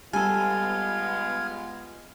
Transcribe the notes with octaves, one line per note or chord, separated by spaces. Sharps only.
G3 G#3 B3 F4 A4 G#5 F6 G#6